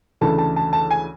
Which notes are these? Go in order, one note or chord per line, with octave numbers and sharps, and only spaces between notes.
D2 C#3 E3 A3 A5
A5
A5
A5
G#5